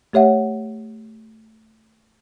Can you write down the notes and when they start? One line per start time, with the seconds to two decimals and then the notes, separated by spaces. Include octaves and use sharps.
0.13 A3 G4 C#5 E5 F#5